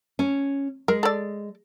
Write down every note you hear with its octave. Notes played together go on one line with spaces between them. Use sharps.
C#4
G#3 A#4
A4 D5